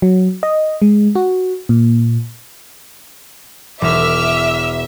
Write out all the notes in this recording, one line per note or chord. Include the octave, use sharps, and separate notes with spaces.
F#3
D#5
G#3
F#4
A#2
E1 E5 D6 E6 F6